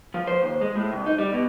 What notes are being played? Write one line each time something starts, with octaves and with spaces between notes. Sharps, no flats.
F3
C5
D#2
G#3
A2
C2
D#4
G3
B2